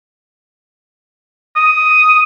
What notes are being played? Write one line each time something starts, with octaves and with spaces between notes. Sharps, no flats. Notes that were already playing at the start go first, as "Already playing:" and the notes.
D#6